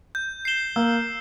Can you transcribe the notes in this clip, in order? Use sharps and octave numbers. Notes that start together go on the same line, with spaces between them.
G6
C7 E7 G7
A#3 E6